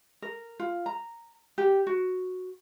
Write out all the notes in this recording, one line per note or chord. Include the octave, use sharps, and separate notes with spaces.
A#4
F4
A#5
G4
F#4